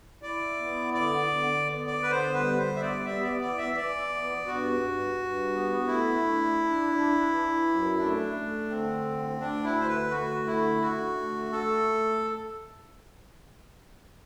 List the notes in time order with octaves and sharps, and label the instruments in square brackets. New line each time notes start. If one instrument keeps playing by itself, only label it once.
[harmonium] E4 [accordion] D5
[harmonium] B3
[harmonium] D3 [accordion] D5
[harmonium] D3
B3
[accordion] D5
[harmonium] D3 [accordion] B4
[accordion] C5
[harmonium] G3 [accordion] B4
[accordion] C5
[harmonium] B3
[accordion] E5
D5
[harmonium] B3 [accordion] E5
[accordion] D5
[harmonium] E3 [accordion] D5
[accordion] E5
[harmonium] E3 [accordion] D5
[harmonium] B3
[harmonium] G2 [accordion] F#4
[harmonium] G2
G2
B3
[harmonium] A3 [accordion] E4
[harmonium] D4
D4
D4
E3
F#2
[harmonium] A3 [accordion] D4
[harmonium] A3
[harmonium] D3 [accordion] C4
[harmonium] D2
[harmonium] D2 [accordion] D4
[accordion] E4
[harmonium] D3 [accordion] C5
[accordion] B4
[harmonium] A3 [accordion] F#4
[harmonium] D3 [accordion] E4
[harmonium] D3 [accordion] F#4
[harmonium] A3
[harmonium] A3 [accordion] A4